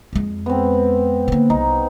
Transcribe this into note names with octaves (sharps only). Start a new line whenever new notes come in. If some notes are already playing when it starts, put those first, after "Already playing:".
F2 G#3
B3 C4
D3 A#3
C2 D#4